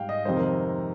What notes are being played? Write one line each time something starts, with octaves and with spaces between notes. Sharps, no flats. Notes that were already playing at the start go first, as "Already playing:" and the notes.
Already playing: G#2 G3 F5 G5
D#5
F2 C3 D#3 G#3 C5
A#4